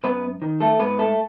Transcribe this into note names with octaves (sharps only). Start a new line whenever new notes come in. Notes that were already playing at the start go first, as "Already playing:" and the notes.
F#2 B3 B4
D#3
A3 A4
G#2 B3 B4
A3 A4